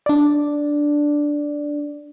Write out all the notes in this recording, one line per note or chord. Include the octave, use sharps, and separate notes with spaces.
D4 D5